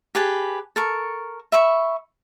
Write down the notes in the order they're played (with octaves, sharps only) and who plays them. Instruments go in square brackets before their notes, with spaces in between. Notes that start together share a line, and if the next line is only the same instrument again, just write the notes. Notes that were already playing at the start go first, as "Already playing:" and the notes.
[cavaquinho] G4 G#4 B4 A5
A4 A#4 C#6
E5 B5 C#6